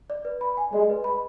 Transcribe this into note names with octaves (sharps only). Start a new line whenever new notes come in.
D5
B4
B5
G#5
G#3 D5
B4
B5